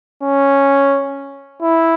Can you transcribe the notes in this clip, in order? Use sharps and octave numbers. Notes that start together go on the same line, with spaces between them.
C#4
E4